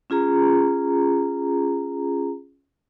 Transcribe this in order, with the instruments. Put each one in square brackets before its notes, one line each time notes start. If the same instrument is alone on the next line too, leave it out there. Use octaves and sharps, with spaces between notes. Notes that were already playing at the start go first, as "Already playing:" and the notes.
[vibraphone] C#4 F4 G#4 A#5